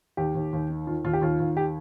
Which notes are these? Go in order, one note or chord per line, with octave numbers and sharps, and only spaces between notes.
D#2 G4
D#2
D#2
D#3
D#3 F4
D#2 F4
G4
D#2 F4
D#2
G4